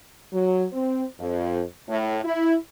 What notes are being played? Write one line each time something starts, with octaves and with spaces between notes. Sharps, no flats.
F#3
C4
F2
A2
E4